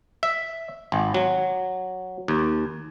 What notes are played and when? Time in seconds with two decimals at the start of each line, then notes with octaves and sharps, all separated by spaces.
0.23 E5
0.92 G#1
1.14 F#3
2.28 D#2